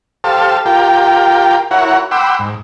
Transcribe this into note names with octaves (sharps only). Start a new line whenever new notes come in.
G4 A4 C5 F5 A5
F4 G4 A#4 G5
E4 F#4 A#4 C#5 F#5
F#5 G5 B5 C6 D6 E6
G#2